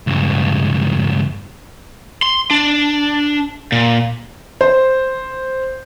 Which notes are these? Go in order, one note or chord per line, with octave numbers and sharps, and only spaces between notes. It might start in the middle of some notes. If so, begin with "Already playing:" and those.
C#2 G2
C6
D4
A#2
C5